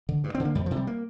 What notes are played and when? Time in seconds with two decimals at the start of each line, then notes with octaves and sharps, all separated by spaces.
0.09 D3
0.24 G2
0.35 C4
0.40 D3
0.45 A#3
0.55 F2 G3
0.66 C3 F3
0.76 G3
0.87 A#3